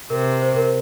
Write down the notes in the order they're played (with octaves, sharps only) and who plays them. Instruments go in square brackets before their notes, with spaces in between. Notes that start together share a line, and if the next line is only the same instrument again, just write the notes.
[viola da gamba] C3 [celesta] A#4
[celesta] C5
A#4